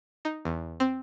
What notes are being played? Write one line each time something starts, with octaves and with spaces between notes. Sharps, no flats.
D#4
E2
C4